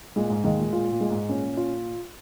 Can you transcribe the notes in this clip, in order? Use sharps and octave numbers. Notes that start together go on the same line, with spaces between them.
A#2 G#3
G#2
D#2 D#3 G#3
A#2
A#2 F4
A#2
G#3
G#2
A#2 C#4
F4